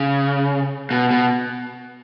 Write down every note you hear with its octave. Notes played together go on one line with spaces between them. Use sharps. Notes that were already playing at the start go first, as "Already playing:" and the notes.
Already playing: C#3
B2
B2